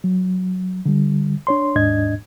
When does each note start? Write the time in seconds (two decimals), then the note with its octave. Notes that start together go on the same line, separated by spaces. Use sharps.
0.04 F#3
0.86 D3 G3
1.47 D4 C#5 C6
1.76 D#2 G#2 D4 D#5 G#6